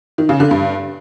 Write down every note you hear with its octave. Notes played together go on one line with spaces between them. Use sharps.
D#3
C#3
D3
G2